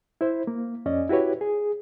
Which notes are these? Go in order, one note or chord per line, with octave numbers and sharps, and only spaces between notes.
E4 C5
A#3
F2 C#4 D5 D#5
E4 F#4 G4 B4 C#5
G#4